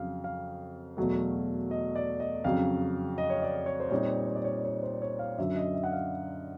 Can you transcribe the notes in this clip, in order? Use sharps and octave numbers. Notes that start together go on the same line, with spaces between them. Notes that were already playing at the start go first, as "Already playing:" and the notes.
Already playing: F2 C#3 F#3 F5
F5
E2 B2 F#3 A3
D#5
D5
D#5
F2 C#3 F#3 F5
D#5
C#5
D5
C#5
C5
A#2 G3 C4 D#4 C#5
C#5
D5
C#5
C#5
C5
C#5
F5
F#2 D3 F#3 E5
D#5
E5
F#5
F5